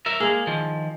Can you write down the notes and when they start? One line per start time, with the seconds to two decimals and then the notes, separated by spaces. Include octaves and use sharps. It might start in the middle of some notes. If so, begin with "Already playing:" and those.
0.06 A#4 E5
0.20 G#3 A#3 G#4
0.47 D#3 F3